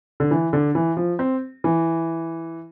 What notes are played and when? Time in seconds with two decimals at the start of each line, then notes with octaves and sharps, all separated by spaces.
0.20 D3
0.31 E3
0.53 D3
0.75 E3
0.97 F3
1.19 C4
1.64 E3